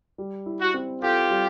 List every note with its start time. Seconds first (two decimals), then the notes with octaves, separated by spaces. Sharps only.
0.18 G3
0.46 E4
0.60 F#4
0.74 C4
1.02 F4 G4 A4
1.30 G3